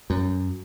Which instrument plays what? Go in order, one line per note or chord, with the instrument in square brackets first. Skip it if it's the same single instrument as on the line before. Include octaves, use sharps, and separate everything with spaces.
[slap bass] F#2